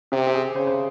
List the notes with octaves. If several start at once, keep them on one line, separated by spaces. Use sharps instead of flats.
C3 G4
G4
G#4
C#3 C5
C5